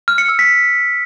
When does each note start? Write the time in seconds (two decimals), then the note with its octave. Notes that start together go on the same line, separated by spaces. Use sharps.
0.08 F6
0.18 C#7
0.29 E6
0.39 B6